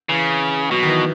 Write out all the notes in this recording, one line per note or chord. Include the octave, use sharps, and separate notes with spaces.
C#3 E3
B2 F#3
D#3
E3